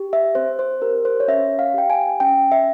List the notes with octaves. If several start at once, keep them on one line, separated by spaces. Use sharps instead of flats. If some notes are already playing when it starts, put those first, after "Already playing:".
Already playing: G4
E5
C4 C5
C5
G4 A#4
C5
C#5
C#4 E5
F5
G4 G5
G#5
C#4 G5
E5